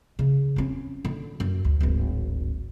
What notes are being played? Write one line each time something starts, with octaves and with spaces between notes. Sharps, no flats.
C#3
C4 C#4
D3
F#2
D2
D1 G#1